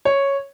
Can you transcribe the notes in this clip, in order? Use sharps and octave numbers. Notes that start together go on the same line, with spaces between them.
C#5